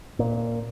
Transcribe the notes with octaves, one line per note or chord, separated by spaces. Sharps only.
A#2